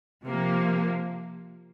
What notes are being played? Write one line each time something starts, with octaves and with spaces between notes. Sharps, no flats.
C3 F3 A#3